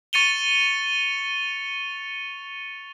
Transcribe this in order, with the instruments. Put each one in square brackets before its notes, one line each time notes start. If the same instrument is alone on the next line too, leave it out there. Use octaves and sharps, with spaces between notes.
[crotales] C#6 A6 C#7 D#7 F7 G7